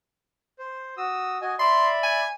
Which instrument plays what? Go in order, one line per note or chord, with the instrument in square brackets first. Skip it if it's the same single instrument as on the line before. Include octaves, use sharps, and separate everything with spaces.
[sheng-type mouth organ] C5
F#4 D#6 E6
F#4 D#5 G#5
[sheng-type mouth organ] D5 E5 B5 [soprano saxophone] C6
[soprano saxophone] G#5